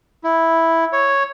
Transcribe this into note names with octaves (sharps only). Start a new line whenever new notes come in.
E4
C#5